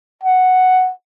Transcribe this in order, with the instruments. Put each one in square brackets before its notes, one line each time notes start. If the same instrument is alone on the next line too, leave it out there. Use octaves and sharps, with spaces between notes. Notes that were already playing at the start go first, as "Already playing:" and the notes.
[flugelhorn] F#5